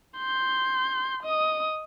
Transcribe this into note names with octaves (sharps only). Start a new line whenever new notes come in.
C6 G6
D#5 D#6